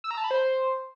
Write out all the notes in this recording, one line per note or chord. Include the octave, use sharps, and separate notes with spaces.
E6
A#5
A5
B5
C5